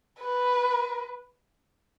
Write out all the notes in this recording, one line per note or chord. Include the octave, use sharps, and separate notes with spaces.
B4